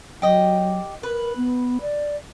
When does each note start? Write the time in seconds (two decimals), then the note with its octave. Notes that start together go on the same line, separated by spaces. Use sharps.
0.22 F#3 G4 D#5
1.03 A#4 B4
1.36 B3
1.81 D5